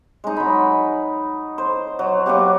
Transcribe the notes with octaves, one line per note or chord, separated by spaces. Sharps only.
G#3 D#4
F#3 B5
C5
F#3
F#3 A#3 B3 G4